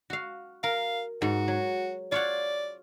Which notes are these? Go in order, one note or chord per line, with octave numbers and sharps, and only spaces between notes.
F#4 F5
A#4 F5
G#2 F#4
F#3
F4 C#5 D5 F#5